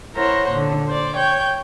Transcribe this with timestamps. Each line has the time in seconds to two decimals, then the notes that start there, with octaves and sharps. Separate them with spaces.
0.15 E4 A#4 C5 C#5 F#5
0.50 A#2 D3
0.87 C5 D5
1.16 C#5 G5 G6